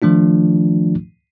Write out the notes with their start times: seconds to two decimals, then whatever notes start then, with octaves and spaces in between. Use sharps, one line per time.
0.02 D#3 F3 A3 D4 F4